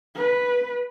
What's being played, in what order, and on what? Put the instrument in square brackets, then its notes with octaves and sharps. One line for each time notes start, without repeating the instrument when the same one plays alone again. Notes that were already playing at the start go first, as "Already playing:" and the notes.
[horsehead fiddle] B4